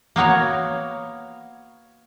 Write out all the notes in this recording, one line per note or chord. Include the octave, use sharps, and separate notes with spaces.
A#3 B3 F#4 C#5